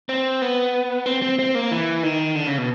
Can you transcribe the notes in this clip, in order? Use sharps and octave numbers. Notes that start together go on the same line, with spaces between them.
C4
B3
C4
C4
C4
A#3
E3
D#3
D3
C#3
B2